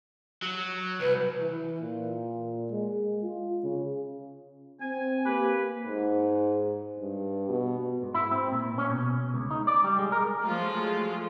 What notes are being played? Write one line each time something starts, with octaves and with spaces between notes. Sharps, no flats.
F#3
C2 B4
E3
A#2
G#3
F4
C#3
C4 G#5
A#3 G4 B4
G#2
G2
B2
G#2
E4
C4
A#2
C#4
B2
C#2
D#4
D5
G3
G#3
A#4
F3 F#3 G#3 A3 F4